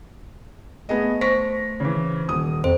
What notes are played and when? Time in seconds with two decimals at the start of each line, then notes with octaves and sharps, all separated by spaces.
0.89 A3 B3 G#4 D#5
1.21 C5 C#6 A#6 B6
1.80 C#3 E3
2.28 D#1 D#6
2.64 F2 C5